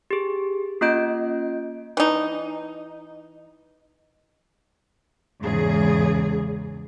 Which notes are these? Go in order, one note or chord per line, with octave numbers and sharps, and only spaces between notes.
G4 G#4
A#3 C#4 F4 D#5 G6 D7
E3 D#4
E2 G#2 C#3 G#4